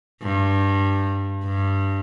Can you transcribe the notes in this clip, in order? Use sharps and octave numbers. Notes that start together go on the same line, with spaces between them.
G2
G2